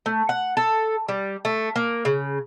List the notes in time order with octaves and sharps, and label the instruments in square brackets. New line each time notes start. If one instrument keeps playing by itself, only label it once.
[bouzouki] A3
F#5
A4
G3
A3
A#3
C#3